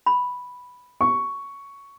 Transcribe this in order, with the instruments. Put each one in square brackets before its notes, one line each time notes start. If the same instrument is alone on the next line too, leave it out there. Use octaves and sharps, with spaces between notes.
[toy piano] B5
[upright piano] C#6